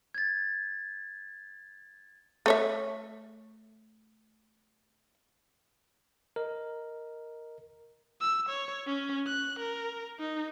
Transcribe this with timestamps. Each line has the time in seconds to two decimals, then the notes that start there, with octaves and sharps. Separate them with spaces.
0.14 G#6 A6
2.46 A3 C#5 E5
6.36 A#4 D#5
8.21 E6
8.49 C#5
8.87 C#4
9.27 F#6
9.59 A#4
10.20 D#4